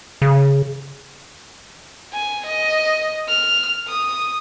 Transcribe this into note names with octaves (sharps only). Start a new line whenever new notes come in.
C#3
G#5
D#5
F6
D#6